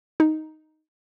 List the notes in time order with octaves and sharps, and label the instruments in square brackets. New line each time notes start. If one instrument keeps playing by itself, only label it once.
[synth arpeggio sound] D#4